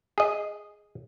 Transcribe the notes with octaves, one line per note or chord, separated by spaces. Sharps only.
G#4 D#5